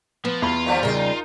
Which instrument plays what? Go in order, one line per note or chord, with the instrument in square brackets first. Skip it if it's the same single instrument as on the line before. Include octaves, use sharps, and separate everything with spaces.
[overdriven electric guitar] F3 [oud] B3
[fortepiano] E2 B5 [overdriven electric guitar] F4
[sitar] D#3 F3 G3
[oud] C#3 G3 [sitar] D#4 A#4